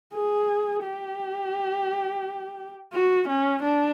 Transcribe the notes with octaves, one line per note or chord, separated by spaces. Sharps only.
G#4
G4
F#4
C#4
D4